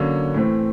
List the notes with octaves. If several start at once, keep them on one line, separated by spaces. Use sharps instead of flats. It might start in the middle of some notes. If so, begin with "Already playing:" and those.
Already playing: D3 F#3 A#3 C#4
A2 E3 A3 C4